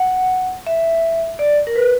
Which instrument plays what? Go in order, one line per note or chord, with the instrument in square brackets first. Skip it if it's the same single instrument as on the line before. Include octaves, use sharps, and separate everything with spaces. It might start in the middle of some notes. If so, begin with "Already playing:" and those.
Already playing: [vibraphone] F#5
E5
D5
A#4
B4